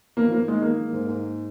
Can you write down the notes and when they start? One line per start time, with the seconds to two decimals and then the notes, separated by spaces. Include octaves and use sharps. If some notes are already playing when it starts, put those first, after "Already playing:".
0.17 D#3 A#3
0.28 F3
0.33 A#3
0.39 D#3
0.48 G#3
0.62 A#3
0.78 D#3
0.93 G#2
1.07 G#2